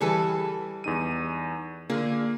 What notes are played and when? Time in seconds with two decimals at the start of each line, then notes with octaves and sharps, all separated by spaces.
0.01 E3 G3 G#4 A4 B4
0.84 E2 D#4 D#7
1.89 D3 A#3 F4 G#4